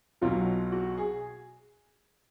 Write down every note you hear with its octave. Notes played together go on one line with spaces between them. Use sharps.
B1 B2 F#3 F4
F#4
G#4